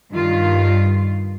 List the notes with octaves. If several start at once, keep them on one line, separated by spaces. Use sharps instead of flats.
G2 D#3 F4